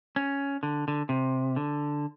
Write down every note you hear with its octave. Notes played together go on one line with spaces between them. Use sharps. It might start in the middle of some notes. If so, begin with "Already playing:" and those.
C#4
D3
D3
C3
D3